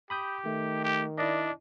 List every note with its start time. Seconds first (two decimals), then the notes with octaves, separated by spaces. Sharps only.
0.10 G4 B5 D#6 G6
0.46 D#3 A3
0.84 G4
1.18 D4 E4 D5 D#5